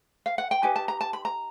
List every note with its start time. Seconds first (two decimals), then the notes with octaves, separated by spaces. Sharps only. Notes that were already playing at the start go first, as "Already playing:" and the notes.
0.26 F5
0.38 F#5
0.51 G5
0.63 D#4 G4 B4 G#5
0.76 A5
0.88 A#5
1.01 A5
1.13 B5
1.25 A#5